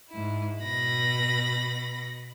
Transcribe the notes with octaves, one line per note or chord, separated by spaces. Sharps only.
G#2 E4
B2 B5 A#6